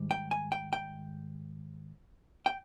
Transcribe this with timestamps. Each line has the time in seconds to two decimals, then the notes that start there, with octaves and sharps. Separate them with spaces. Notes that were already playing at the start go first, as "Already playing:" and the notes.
Already playing: G#2 D#3 G3
0.11 G5
0.31 G#5
0.52 G5
0.73 G5
2.46 G5